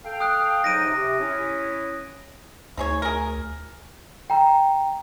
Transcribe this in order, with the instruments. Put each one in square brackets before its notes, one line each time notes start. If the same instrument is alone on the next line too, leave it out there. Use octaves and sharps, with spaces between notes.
[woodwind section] A4 F5 G5
[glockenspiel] D#6 F#6
[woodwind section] G#2 F#3 D#4 [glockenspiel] A#6 D7 D#7
[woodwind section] C3
C#4 E4
[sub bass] D2 [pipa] D#4 G#4 C#5
[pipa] G#4 A#4
[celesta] G5 A#5